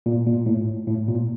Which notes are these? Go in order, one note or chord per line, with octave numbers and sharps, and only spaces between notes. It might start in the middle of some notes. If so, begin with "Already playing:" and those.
A#2
A#2
A2
A2
A#2